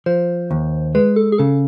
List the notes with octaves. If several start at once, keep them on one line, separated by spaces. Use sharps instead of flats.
F3 C5
D#2
G#3 B4
A4
G#4
C#3 A4